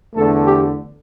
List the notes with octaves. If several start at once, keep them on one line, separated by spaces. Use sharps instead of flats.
E2 D3 A3 A4
G4